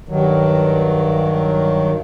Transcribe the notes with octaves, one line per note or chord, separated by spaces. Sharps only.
G2 D#3 F#3